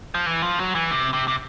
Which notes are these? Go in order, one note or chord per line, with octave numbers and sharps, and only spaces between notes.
F3
E3
F3
F#3
E3
C3
C3
C3